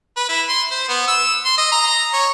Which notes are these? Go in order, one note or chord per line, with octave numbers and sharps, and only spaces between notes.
B4
E4
C6
C5
B3
E6
C6
D#5
A#5
C#5